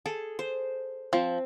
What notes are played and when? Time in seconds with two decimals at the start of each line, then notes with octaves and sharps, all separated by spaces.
0.06 G#4 A4
0.39 C5
1.13 F3 C4